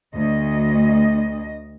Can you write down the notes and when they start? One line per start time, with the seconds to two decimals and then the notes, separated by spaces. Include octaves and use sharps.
0.15 D2 D#5